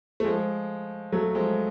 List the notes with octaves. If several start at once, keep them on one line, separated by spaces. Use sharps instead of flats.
A3
F3 G#3
F#3 A3
F3 G#3